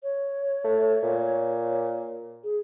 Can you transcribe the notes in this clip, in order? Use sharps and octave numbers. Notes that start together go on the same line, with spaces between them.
C#5
A3
A#2
G#4